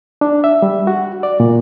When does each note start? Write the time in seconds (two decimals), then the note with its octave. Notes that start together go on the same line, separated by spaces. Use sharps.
0.21 D4
0.44 E5
0.62 G3
0.87 F#4
1.23 D5
1.40 A#2